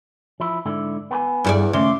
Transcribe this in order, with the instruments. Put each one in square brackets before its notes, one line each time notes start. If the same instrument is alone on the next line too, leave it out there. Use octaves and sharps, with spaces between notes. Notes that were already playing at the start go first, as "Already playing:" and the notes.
[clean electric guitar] F3 E4
G#2 D3 E4
B3 B4 G#5
[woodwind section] E2 [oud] G2 A4 D5
[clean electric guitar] D#2 A3 [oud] C#3 [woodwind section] E5 C6 D6